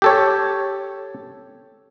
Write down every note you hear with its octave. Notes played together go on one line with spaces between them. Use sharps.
G4 A4 C#5